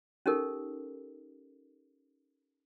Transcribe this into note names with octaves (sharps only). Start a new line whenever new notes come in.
C#4 D#4 G4 A4 A#4